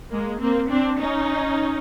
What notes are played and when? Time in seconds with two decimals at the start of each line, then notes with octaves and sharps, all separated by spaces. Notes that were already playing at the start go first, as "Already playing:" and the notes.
0.11 G#3 A#3
0.40 A#3 C4
0.69 C4 D4
0.99 C#4 D#4